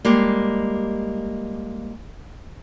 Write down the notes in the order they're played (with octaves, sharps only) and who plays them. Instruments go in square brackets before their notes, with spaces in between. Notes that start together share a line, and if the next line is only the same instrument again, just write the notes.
[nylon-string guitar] G3 G#3 A#3 G4